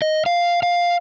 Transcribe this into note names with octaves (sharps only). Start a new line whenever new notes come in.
D#5
F5
F5